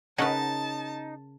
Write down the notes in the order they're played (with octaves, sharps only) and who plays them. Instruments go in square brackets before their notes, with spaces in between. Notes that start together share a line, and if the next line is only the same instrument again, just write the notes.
[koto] C#3 A#4 B4 [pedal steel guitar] D#4 [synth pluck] C#5 D#5 F#5 [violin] A5